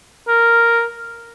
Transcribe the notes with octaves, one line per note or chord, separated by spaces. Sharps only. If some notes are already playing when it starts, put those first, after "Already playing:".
A#4